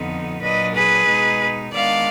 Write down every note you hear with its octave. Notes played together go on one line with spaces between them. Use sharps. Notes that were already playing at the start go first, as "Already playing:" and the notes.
Already playing: F2 D3 F3 B3 D#4
A#2 F#3 D4 B4 D#5
G#4 B4
B2 G#3 D#4
D#3 G#3 B3 D4 D5 F5